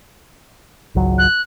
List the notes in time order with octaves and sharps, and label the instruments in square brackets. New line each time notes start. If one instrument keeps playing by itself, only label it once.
[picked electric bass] G#1 C#2 F#3
[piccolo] F#6